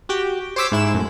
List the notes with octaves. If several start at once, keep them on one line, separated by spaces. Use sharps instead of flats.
F#4 G4 G5
C5 C#5 D6 E6 B6
G#2 E4 E7
F#2 A2